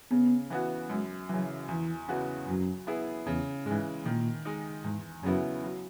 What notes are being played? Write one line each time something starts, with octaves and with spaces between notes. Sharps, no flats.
C#3 B3
E3 B3 F#4
F#2 G#3
C#3 E3 F#3
E2 E3
C#3 E3 B3 F#4
F#2 F#3
B3 E4 G#4
E2 C#3
G#2 E3 G#3
A#2 D#3
G#3 D#4
E2 G#2
F#2 C#3 F#3 B3 E4
F#3